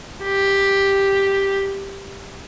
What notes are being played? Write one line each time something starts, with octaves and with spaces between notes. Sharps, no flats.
G4